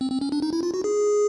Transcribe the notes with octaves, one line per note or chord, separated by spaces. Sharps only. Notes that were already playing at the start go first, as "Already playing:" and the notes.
C4
C4
C#4
D4
D#4
E4
F4
F#4
G#4